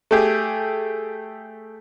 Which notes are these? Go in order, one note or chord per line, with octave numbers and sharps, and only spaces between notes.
A3 G4 G#4